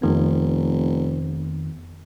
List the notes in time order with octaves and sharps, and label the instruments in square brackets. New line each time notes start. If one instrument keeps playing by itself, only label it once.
[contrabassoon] F1 [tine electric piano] F2 D#3 B3